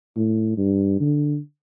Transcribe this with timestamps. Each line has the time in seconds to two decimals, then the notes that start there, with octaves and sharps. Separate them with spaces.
0.16 A2
0.57 G2
1.00 D3